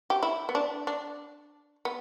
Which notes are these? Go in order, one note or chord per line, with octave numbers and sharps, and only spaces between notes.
G4
E4
B3
D4
D4
B3